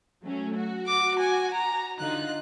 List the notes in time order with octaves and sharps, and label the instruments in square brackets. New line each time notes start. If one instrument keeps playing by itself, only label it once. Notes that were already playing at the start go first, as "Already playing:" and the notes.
[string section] F#3 A3 C#4
F#4
[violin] D6
G#5
A#5
[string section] D3 D#4 F4 [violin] F#6